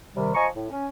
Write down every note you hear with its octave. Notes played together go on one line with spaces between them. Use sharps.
C3 D#3 G3
F3 D#5 G#5 A#5 C#6
A2
C#4